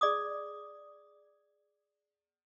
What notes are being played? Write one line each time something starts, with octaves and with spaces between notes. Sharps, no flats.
G#4 D5 D6 D#6